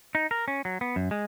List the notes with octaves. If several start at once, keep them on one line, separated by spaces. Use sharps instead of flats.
D#4
A#4
C#4
F#3
B3
F#2
G#3